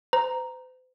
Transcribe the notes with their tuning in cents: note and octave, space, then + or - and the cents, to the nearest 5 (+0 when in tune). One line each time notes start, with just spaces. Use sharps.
C5 -45 A#5 +0